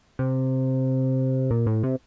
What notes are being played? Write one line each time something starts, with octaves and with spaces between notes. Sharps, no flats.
C3
A#2
A2
C3